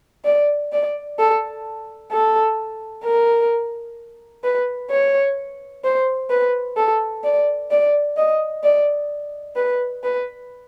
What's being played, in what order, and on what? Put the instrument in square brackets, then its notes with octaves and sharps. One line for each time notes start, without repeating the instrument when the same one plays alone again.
[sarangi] D5
D5
A4
A4
A#4
B4
C#5
C5
B4
A4
D5
D5
D#5
D5
B4
B4